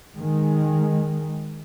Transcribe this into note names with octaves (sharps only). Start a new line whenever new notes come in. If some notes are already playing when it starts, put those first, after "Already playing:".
D#3 G#3